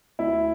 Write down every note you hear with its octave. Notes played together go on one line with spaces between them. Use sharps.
D2 E4